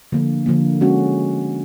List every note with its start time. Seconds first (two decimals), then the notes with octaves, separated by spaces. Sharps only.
0.12 D3 F3 A#3
0.46 D3 F3 A#3
0.81 G#3 C#4 F#4